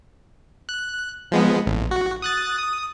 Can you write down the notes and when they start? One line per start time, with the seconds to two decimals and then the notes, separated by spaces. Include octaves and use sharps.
0.69 F#6
1.32 F3 G#3 B3
1.66 A1
1.91 F#4
2.22 D#6 F#6 A6
2.58 D#6